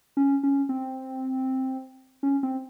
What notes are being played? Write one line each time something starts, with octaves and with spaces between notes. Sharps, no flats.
C#4
C#4
C4
C#4
C4